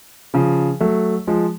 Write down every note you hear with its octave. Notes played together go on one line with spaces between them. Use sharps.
C#3 F3
F#3 A3
F3 G#3